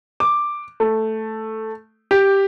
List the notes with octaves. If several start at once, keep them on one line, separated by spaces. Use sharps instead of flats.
D6
A3
G4